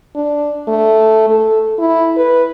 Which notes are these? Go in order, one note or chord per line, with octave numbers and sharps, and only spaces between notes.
D4
A3
A4
E4
B4